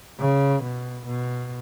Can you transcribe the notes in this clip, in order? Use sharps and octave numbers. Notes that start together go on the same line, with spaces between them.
C#3
B2
B2